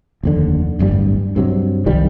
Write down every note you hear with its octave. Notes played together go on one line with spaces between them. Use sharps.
F1 D#2 D3
D1 G1 G2 G3
G2 C3 F#3
C2 D#3 F3 G3